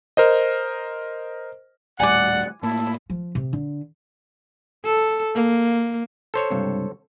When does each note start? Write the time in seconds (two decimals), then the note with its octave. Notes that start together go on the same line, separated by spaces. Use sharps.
0.17 A#4 C5 D#5
2.00 D#1 A2 G3 D5 F#5 G#5 D6
2.63 A2 A#3 E4 A5
3.10 F3
3.35 C3
3.53 D3
4.85 A4
5.35 A#3
6.34 A4 C5 C#5
6.50 C#2 G2 C3